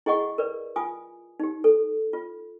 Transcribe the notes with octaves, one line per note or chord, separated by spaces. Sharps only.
E4 G#4 D#5 F#5 C#6
A#4 B4 D5
F4 G#5 D#6
D#4 G4
A4
F4